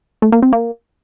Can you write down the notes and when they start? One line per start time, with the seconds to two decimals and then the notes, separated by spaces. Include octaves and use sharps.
0.22 A3
0.32 A#3
0.42 C4
0.53 A#3